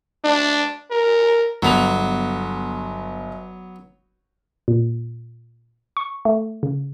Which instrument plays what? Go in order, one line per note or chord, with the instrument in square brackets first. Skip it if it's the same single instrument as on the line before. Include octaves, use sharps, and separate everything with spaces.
[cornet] D4
A#4
[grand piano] G1 F7 [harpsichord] F#3 B3
[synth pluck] A#2
C#6
A3
C#3